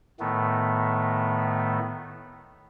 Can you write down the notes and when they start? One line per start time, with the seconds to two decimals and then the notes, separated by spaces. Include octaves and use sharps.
0.20 A2 D#3 A3 B3